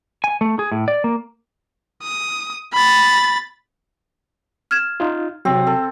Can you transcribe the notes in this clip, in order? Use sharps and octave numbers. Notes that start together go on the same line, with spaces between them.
G#5
A3
G#4
A2
D5
A#3
D#6
B5 A6
F6 G#6 E7
D#4 F4
C3 F#3 C4
A4